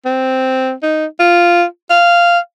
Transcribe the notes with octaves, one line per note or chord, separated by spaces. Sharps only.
C4
D#4
F4
F5